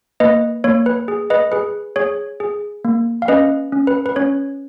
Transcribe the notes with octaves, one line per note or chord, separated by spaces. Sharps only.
A#3 B4 D#5
A#3 C#5
B4
G#4
B4 D#5
G#4 B4
G#4 C#5
G#4
A#3
F5
C#4 B4 D#5
C#4
B4
B4
C#4 C#5